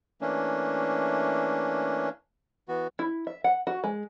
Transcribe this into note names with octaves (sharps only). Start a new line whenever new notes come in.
E3 A3 A#3 C#4 D4
E3 B3 F#4
E4
E5
F#5
F#4
G#3